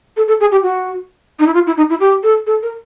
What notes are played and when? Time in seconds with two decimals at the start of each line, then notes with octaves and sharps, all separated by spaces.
0.17 A4
0.28 A4
0.40 G#4
0.52 G4
0.63 F#4
1.40 D#4
1.46 E4
1.54 F4
1.67 E4
1.77 D#4
1.90 E4
2.00 G4
2.23 A4
2.47 A4
2.63 A#4